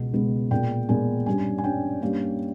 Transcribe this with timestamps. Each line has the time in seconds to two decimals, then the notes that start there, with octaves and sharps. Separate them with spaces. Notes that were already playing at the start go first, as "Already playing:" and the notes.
Already playing: C#2 B2 G#3 B3
0.14 C#2 B2 G#3 B3
0.51 A#2 G#3 B3 G5
0.89 A#2 G#3 B3 G#5
1.26 G2 G3 C#4 G#5
1.58 G#5
1.64 G2 G3 C#4 G5
2.02 G2 G3 A#3 C#4